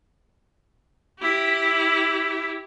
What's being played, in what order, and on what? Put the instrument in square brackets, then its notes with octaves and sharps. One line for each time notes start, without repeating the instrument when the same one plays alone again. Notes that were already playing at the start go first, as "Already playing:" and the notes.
[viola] E4 G4